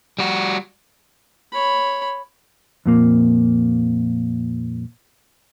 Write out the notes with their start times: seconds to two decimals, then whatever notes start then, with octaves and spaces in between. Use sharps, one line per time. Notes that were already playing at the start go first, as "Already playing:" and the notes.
0.19 G3 F#4
1.52 C#5 B5
2.86 F2 A#2 A#3